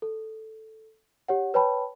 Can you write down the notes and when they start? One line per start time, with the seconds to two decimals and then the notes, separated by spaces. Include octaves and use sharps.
0.02 A4
1.28 G4 C#5 F#5
1.54 B4 C#5 G5 A5 B5